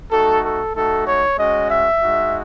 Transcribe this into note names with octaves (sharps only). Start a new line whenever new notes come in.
A3 D#4 F#4 A4
A4
A3 D#4 F#4 A4
C#5
G#3 C#4 F#4 D#5
E5
G#3 D#4 F#4